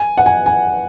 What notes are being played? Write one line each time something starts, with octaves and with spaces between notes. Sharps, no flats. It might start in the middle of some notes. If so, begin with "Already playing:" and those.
Already playing: G#5
F#5
G#5
G#5